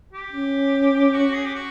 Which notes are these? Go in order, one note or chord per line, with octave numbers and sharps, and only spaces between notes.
G4
C#4
F#4
G#4
G4
F#4